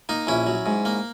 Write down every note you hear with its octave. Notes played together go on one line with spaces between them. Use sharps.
A#3 D#4
A#1 C#4 E4
F#3
G#2
A#3